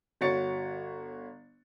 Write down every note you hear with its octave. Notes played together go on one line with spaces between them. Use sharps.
G1 F#4 C#5 A6 C#7